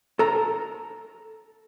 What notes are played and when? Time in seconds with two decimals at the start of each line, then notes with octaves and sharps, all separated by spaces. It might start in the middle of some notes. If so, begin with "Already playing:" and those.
0.19 A4 A#5